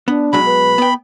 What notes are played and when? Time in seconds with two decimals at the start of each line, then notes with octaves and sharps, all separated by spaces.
0.08 B3 D4
0.33 B2 F#3 G#3 B5
0.46 B4
0.78 B3 G5